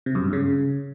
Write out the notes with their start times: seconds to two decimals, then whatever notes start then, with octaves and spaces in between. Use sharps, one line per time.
0.06 C3
0.15 F#2
0.24 G2
0.33 C#3